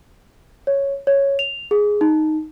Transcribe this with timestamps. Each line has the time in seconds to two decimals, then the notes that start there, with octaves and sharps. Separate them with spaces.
0.67 C#5
1.07 C#5
1.39 F7
1.71 G#4
2.01 D#4